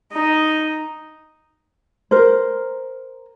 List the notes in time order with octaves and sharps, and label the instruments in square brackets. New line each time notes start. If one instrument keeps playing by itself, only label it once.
[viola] D#4
[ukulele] A#4 C5